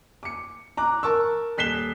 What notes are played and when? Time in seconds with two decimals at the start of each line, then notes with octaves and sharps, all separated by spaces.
0.23 D6 C#7
0.77 A#5 D6 F#6
1.03 A#4 A5 C#6 E6
1.58 D#1 F#6 B6 C7 E7 G7